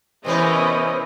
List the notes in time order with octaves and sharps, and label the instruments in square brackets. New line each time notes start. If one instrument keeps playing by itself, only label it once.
[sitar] C3 E3 C#4 [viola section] B3 A#4 [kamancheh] E4 D#5 [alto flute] C5